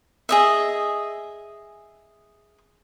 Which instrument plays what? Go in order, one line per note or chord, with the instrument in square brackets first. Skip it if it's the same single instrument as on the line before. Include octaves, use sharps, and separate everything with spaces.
[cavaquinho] G#4 D#5 E5